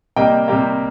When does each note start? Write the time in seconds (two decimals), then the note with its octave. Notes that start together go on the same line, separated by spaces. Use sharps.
0.16 C3 G3 A#3 D#5 G5
0.48 C3 G3 A#3